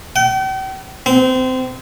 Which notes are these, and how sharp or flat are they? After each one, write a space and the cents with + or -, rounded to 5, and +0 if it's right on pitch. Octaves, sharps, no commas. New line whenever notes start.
G5 -45
C4 -25